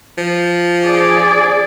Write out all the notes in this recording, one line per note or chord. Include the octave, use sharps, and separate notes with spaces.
F3
G#4 D5